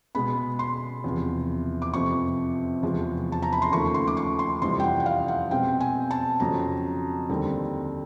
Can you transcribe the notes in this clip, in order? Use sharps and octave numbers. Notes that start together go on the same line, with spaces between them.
B2 G#3 B3 B5
C6
E2 C3 F3
D6
F2 C3 F3 C#6
E2 C3 F3 G#3
A5
A#5
B5
C6
D#2 C#3 F3 A3 C#6
C6
D6
C#6
C6
F2 C3 E3 G3 C6
G5
F#5
F#5
F5
F#5
B2 G#3 C4 G5
G#5
A5
F2 C#3 F#3 A#5
D#2 D3 G3 C4